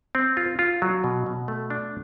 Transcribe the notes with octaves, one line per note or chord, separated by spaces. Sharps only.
C4
F4
F4
F#3
B2
B2
A3
D4